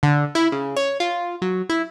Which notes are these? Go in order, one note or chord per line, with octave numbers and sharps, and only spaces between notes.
D3
E4
C#3
C#5
F4
F#3
E4